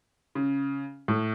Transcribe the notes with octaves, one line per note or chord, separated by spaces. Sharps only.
C#3
A2